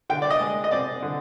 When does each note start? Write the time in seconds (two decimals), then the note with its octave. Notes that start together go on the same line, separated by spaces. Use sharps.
0.10 D3 G5
0.22 D5
0.30 D#5
0.41 G#3
0.64 D#5
0.71 C4 D5
1.03 D3